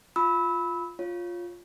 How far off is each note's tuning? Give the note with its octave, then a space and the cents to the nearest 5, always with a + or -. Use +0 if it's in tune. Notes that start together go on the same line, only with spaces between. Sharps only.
F4 +0 B5 +0 E6 -25
F4 +5 C#5 +0